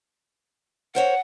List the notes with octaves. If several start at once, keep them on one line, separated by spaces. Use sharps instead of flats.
A#4 C5 C#5 F#5